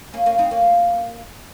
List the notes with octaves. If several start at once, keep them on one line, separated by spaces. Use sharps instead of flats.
A#3 C#4
A#3 C#4
C4 D#4
A#3 C#4